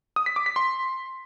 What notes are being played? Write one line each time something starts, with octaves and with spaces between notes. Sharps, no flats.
D#6
B6
D6
B6
C6